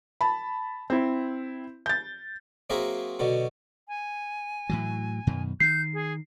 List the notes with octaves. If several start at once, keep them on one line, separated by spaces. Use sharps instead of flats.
A5 B5
C4 E4
G6 A6
F#3 A#3 C4 G#4 A#4 E5
B2 D3 F#3
G#5
A2 E3 F#3
F#2 B2 D#3
D#3 G6 C7
G#4